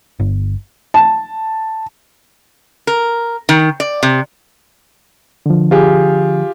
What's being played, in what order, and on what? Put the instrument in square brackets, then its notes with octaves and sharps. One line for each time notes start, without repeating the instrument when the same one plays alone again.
[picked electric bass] G1
[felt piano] A5
[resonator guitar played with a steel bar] A#4
D#3
D5
C3
[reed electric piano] D3 F3
[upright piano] F4 G4 G#4